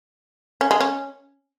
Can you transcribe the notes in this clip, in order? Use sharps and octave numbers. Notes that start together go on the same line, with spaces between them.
C#4
G#3
C#4